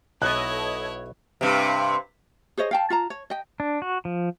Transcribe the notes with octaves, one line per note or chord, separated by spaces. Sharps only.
B1 B3 E4 A4 C#5 D#5 F#6 G#6
G2 C3
G#4 C5 C#5 D#5
F5 G5 A5
F4 A5 A#5
C#5
D#5 G5
D4
F#4
F3